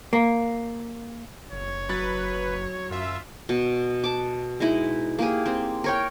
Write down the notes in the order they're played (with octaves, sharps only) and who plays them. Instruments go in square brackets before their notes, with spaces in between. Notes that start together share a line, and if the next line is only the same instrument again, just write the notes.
[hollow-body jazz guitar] A#3
[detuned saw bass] F#1 [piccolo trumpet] C#5
[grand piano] F#3 A6 [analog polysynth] B4
[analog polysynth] F#2 E5 [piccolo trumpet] F4
[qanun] B2
A5 D6
G#3 D#4 E4
A#3 G4 G#4
C4
A#4 C#5 G5